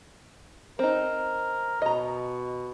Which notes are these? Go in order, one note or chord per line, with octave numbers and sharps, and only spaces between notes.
C4 D#4 A#4
B2 D#5 A#5